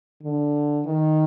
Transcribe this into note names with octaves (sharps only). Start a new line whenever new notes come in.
D3
D#3